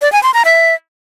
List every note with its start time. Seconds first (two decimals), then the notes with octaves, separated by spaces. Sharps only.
0.02 D5
0.12 G#5
0.23 C6
0.34 A#5
0.45 E5